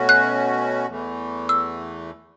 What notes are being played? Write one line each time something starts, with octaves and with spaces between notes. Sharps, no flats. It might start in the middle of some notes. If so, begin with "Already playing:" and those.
Already playing: B2 A3 C#4 F#4
F#6
E2 E3 A3
E6